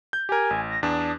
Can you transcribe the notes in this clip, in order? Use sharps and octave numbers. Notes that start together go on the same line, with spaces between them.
G6
G4 A#4 G#5
A1
A#6
E2 D4 D#6